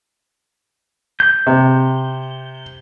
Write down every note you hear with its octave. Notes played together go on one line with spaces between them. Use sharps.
G6
C3